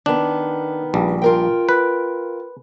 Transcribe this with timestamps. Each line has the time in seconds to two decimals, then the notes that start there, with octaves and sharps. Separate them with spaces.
0.06 D#3 B3 D4
0.94 A#1 G3
1.22 F4 A#4 G5
1.69 B4